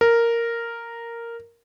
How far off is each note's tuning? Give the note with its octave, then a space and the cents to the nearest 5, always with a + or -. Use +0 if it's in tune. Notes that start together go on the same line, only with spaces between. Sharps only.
A#4 -5